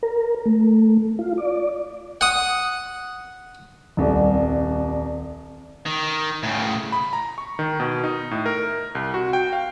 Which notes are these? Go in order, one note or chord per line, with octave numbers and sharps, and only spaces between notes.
A#4
A3
F4
D5
F#5 D#6
D#1 C2
D#3
A2 C#3
B5
A#5
C#6
D#3
B2
D#4
A2
A#4
C2
F#4
G5
F5